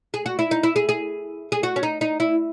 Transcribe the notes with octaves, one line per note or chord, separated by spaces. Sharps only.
G#4
F#4
E4
D#4
E4
G#4
G#4
G#4
F#4
C#4
D#4
D#4
E4